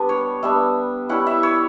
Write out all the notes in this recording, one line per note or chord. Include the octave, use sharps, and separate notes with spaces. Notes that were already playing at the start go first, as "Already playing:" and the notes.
Already playing: G3 B3 D4 B4
C#5
G3 B3 D4 E5
G3 C#4 E4 F#5
E5
C#5